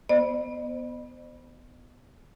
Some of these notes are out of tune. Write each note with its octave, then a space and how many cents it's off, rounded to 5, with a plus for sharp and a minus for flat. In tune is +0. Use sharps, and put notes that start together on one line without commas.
B3 +0 C5 +0 D#5 -45